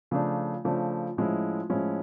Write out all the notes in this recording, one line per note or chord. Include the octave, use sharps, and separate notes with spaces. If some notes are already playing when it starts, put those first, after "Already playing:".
C#3 F3 A3 D4
C#3 F3 A3 D4
A2 F3 G#3 C#4 E4
A2 F3 G#3 C#4 E4